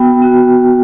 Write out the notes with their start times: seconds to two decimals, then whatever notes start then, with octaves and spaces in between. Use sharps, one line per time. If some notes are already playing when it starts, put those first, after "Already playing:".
Already playing: B3 F#4 G5
0.22 B3 F#4